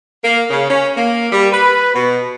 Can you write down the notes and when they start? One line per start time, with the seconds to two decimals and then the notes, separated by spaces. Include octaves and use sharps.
0.24 A#3
0.50 C#3
0.69 C#4
0.97 A#3
1.32 G3
1.52 B4
1.95 B2